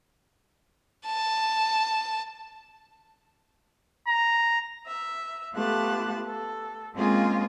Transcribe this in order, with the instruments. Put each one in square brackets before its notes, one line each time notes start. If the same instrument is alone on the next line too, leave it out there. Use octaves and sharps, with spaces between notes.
[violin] A5
[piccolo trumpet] A#5
[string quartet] E5
A3 B3 F4 G4 A5 F#6
A4
G#3 A#3 C4 C#4 F4 G#4